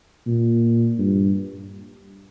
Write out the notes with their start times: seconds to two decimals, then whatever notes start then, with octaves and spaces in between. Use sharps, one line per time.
0.27 A#2
0.98 G2